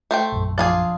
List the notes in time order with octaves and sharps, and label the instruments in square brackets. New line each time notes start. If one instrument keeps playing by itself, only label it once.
[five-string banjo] A3 C5 G5
[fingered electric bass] A#1 F#2
[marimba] F3 [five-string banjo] D4 F4 G#4